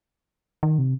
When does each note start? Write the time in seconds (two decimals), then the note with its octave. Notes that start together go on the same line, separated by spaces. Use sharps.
0.63 D#3
0.79 C3